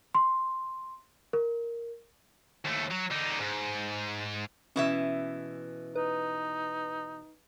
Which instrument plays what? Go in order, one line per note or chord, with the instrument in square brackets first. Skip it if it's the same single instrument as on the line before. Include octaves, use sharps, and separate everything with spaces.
[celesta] C6
A#4
[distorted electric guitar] D#2 A3
F#3
D3 D#4
G#2
[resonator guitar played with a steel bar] B2 E3 E5 [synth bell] C#4
[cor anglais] D#4 [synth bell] B4